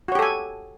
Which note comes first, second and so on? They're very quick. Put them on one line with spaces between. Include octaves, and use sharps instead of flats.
F#4 C#5 G4 A4 G#5